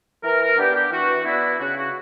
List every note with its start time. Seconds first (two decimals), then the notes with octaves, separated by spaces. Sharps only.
0.23 E3 A#4
0.40 A#4
0.57 B3 D4 G4
0.74 G4
0.92 E3 F#4
1.25 B3 D4 E4
1.59 C#3 F#4
1.76 F#4